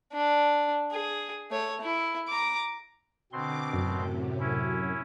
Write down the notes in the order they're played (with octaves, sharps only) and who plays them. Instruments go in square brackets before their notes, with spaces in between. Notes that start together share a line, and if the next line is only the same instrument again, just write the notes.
[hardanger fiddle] D4
G#4
A3 C#5
E4
A#5 D6
[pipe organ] B2 C4 C6 [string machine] D3 D6
[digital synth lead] F#2 [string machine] A2 C3
[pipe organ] C#4 E4